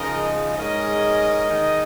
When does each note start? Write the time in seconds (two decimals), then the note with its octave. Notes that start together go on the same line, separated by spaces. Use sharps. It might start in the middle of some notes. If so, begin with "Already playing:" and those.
Already playing: C#3 F3 G#3 D#4 A#4 D#5
0.55 G#2 G#3 C#4 A#4 D#5
1.46 D#3 G#3 D#4